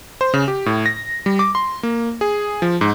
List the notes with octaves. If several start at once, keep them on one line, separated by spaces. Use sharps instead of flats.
C5
C#3
G4
A2
A#6
G3
D6
C6
A#3
G#4
F3
G#2